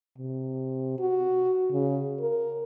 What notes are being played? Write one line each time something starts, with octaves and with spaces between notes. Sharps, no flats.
C3
F#4
C#3
A#4